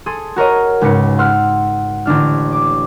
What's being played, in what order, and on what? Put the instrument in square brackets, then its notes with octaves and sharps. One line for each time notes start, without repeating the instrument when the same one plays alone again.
[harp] G#4 A4 C6 D#6
F#4 A#4 C#5 D#5
C#2 G#2 B4 C#7
F#5 C6 E6 F6
A1 D3 D4 F6
D6